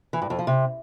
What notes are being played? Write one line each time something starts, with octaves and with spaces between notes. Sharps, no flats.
E3
G2
F2
F3
C3